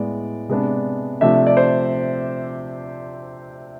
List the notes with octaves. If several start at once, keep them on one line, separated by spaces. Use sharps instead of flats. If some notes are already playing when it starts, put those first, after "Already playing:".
Already playing: A2 G#3 B3 D5
C3 G#3 B3 D4
C3 F3 A3 D4 E5
D5
C5